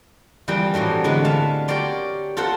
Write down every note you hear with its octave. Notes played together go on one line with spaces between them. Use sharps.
E3 F3 G3 A#3 C4 G5
A2 E3 F#3 A3
D3 E3 G#3 A3 B3
A4 E5 F5 A5
G4 A#4 C#5 D5 C6
F4 A4 A#4 C5 F#5